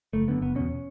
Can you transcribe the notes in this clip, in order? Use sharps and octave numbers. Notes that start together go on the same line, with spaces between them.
F#1 A3
F#2 D3 B3
F#1 B3
E2 B2 C#4